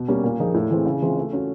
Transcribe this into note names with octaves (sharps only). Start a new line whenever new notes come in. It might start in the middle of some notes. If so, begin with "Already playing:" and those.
Already playing: B2
G3 A#3 C#4
A#2
F3 A#3 D#4 G#4
A2
E3 G#3 C4
C#3
E3 G#3 C4 F4
A3
C#4 F#4